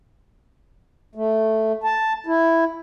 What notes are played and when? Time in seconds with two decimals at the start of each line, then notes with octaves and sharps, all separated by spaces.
1.15 A3
1.84 A5
2.26 E4